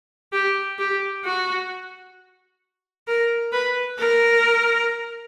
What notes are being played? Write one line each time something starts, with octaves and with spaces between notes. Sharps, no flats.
G4
G4
F#4
A#4
B4
A#4